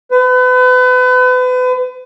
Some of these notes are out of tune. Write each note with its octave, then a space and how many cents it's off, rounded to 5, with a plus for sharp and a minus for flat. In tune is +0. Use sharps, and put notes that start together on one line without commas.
B4 +35